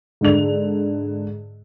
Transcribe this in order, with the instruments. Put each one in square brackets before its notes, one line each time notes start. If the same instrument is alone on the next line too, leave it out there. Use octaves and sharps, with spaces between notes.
[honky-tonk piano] G#2 D3 F7